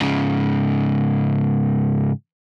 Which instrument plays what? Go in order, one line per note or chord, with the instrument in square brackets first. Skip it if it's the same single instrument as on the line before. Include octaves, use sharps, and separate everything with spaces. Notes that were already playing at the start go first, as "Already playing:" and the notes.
[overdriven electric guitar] G#2 C#3